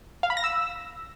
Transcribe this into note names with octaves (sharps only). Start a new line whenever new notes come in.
F5
B5
A#6
E6